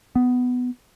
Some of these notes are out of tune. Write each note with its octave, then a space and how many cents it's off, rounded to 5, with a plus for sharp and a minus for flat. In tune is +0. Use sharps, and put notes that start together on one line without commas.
B3 +10